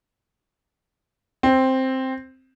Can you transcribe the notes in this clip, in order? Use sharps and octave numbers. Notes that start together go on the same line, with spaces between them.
C4